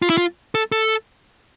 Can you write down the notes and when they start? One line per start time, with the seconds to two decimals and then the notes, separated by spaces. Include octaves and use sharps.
0.02 F4
0.10 E4
0.18 F4
0.55 A4
0.72 A4